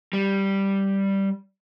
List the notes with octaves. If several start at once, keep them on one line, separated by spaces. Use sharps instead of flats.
G3